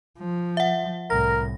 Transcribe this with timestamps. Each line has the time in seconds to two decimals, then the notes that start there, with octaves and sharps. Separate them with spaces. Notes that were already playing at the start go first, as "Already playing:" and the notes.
0.19 F3
0.57 E5 F#5
1.10 C2 A2 A#4 A#6